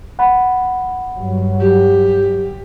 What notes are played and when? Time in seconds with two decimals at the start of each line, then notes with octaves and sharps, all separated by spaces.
0.19 F#5 B5
1.17 G2 F#3
1.60 G4